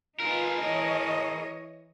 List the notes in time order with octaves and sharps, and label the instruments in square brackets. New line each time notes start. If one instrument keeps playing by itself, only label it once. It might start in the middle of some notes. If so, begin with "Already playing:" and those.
[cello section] D#4 F4 B4 [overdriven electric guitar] G#4 A#4
[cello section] E3 C#5 D#5